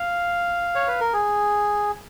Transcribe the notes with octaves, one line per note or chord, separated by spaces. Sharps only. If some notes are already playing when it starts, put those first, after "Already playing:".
Already playing: F5
C#5
B4
A#4
G#4